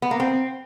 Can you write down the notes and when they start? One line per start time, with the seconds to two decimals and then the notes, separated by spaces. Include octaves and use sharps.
0.02 B3
0.11 A#3
0.20 C4